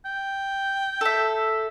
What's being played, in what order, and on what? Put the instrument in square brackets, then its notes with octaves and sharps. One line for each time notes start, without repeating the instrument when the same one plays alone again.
[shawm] G5
[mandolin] A4 E5